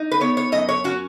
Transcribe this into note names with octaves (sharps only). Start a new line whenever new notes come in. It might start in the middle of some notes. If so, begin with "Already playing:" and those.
Already playing: D#4
B4
B3 C#5
C#5
F#2 D#5
C#5
C#4 F#4